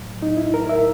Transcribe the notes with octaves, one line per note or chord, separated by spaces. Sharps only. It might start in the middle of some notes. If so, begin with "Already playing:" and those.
Already playing: A2 F#3
D#4
E4
A#4
E5